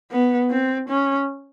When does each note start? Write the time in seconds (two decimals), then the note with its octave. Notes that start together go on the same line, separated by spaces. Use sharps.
0.12 B3
0.51 C4
0.89 C#4